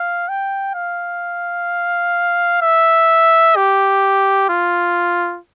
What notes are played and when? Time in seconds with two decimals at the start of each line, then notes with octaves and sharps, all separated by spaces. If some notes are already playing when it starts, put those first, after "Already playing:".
Already playing: F5
0.28 G5
0.75 F5
2.62 E5
3.56 G4
4.49 F4